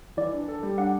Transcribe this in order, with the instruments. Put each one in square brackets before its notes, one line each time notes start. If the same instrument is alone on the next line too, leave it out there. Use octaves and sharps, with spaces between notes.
[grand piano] E3 [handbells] D5
[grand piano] D4
A4
G3
[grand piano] D4 [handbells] F#5